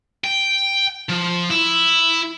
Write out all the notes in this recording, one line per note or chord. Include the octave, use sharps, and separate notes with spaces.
G5
F3
E4